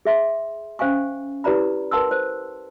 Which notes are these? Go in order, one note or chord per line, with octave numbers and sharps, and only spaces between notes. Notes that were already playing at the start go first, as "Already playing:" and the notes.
G#4 E5 C6
C#4 C5 F5 G#5 C#6
E4 G4 B4 D5 A#5 B5
A#4 B4 F#5 A5 C6 E6
C5